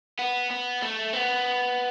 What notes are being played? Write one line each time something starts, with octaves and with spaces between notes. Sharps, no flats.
B3
B3
A3
B3